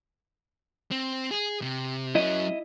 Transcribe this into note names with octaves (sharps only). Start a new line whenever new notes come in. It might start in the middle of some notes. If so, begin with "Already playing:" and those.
C4
G#4
C3
F#3 C#4 E4 D#5